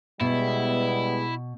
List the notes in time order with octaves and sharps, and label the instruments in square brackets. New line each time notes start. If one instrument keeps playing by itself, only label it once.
[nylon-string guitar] B2 [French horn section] G3 G#3 B3 [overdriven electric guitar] E4